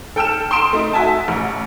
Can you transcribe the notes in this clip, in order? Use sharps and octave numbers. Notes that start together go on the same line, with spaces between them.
A4 G5 E6 F6 E7
C6 D#6 D7 E7
A3 D#4
F#4 E5 G#5 A5
A1